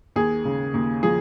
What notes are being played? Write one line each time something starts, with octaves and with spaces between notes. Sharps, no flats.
D#2 G#4
C#3
D#2
F3 G#4